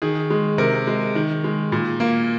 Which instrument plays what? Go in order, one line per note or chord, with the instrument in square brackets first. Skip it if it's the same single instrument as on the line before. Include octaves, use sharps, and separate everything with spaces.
[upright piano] D#3 G#4
G#3
C3 A#4
G#3
D#3
G#3
A#2
A#3